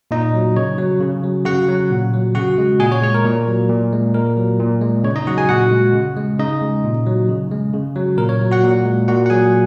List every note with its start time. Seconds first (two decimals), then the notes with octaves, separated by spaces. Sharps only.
0.11 A#2 D#4 D#5
0.34 F#3
0.56 C#3 C#5
0.78 F#3
1.00 C#3
1.24 F#3
1.45 C#3 F#4 F#5
1.69 F#3
1.90 A#2
2.14 F#3
2.35 C#3 F#4 F#5
2.58 G#3
2.80 A#2 G#4 G#5
2.92 C#5
3.02 G#3 C#5
3.14 A#4
3.25 A#2
3.48 F#3
3.69 A#2
3.92 G#3
4.14 A#2 A#4
4.37 F#3
4.59 A#2
4.82 G#3
5.04 C#3 C#5
5.16 D#4 D#5
5.27 F#3 F#4 F#5
5.38 G#4 G#5
5.49 A#2 F#4 F#5
5.72 G#3
5.94 C#3
6.17 G#3
6.38 C#3 D#4 D#5
6.61 G#3
6.84 A#2
7.06 F#3
7.29 C#3
7.51 G#3
7.74 C#3
7.96 F#3
8.18 A#2 A#4
8.29 C#5
8.41 F#3
8.51 F#4 F#5
8.64 A#2
8.85 G#3
9.08 A#2 F#4 F#5
9.26 F#5
9.30 F#3 G#4 G#5